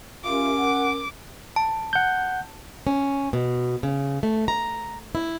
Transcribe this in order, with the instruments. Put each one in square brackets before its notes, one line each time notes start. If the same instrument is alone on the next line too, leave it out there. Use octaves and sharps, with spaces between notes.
[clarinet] C#4 [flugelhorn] F4 [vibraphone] G4 A#4 E5 [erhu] D6
[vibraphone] A#4 [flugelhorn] F#5
[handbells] A5
[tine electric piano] F#5 G6
[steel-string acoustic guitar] C#4
B2
C#3
A3
A#5
E4